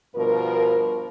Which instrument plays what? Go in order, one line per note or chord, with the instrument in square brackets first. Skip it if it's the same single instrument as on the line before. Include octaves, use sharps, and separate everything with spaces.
[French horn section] G2 B2 F3 A#4